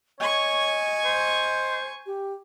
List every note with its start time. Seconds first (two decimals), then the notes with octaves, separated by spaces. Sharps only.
0.20 C#5 D#5 G#5 C#6
1.05 C5
2.06 G4